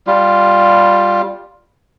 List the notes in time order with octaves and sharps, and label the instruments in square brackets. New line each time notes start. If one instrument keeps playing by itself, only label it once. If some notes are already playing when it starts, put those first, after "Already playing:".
[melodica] G3 F4